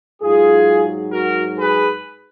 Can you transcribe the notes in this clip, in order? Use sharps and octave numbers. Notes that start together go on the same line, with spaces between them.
G#2 F#3 F4 G#4
F#4 A#4
G#4 B4